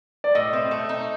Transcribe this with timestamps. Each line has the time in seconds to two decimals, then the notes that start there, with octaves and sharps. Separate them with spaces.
0.24 D5
0.35 A2 D#5
0.53 C4
0.71 A3
0.89 D#4